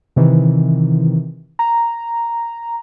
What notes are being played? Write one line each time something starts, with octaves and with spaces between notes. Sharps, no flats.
C3 D#3 E3
A#5